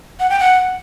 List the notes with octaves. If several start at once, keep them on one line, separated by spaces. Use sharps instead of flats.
F#5
G5
F#5